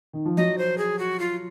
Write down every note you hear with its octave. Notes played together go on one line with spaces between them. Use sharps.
D#3
F3
F#3 D#5
C5
G#4
F#4
F4